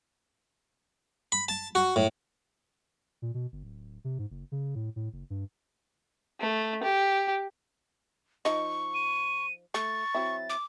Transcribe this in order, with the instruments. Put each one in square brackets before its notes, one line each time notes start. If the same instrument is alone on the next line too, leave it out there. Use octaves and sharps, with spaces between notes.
[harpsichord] B5
A5
F#4
A2
[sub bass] A#2
B2
G1
D1
C3
G#2
F#1
C#3
A2
A2
F#1
G2
[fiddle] A3
G4
[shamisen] F3 D#4 D#5 [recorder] C#6
[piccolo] D#7
[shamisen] A3 [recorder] C#6 [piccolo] A6
[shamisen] F#3 C4 E4
[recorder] D6